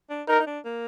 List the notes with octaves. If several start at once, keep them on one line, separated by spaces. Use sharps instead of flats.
D4
D#4 A#4
D#4
D4
A#3